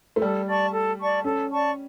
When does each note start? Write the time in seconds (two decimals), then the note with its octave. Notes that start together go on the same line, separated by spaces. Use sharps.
0.16 A3
0.21 G3 A4
0.47 D5 A5 C#6
0.72 A4
0.99 D5 A5 C#6
1.24 C#4 A4
1.51 D5 A5 C#6